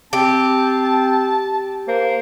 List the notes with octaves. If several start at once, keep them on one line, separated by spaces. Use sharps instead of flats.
C4 G4 A5
A#3 C5